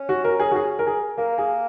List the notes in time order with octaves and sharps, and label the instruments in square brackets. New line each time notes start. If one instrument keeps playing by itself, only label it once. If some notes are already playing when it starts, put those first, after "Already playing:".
Already playing: [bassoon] C#4
[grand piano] F#4
A#4
G#4
F#4
G#4
A#4
G#4
[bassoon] A#3 [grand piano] A#4
[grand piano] G#4